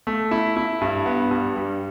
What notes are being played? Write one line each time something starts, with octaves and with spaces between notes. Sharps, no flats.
A3
E4
E4
G2
B3
G2
G3